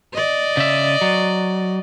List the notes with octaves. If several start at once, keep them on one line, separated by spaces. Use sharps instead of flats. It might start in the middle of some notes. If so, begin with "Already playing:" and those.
D5 D#5
C#3 E5
F#3